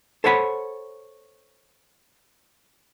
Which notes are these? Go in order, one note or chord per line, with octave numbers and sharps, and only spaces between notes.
A4 C5 C#5 F#5 B5